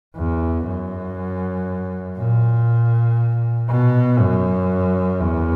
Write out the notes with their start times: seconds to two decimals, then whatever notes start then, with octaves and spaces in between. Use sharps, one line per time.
0.16 E2
0.66 F#2
2.18 A#2
3.69 B2
4.19 F#2
5.21 E2